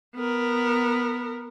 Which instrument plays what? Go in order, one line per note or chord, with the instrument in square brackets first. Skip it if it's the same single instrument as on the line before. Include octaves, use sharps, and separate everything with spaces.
[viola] B3 A#4